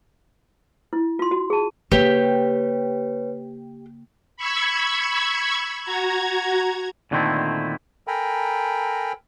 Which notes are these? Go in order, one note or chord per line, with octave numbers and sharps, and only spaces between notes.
E4
F4 C6
F#4
G#4 A5
C#3 A#3 G4 B4 C#5 G5
B5 C#6 E6 G#6
F#4 A#5 G#6
A#2 D3 D#3 A3 C4 E4
A4 A#4 G5 G#5 A#5 B5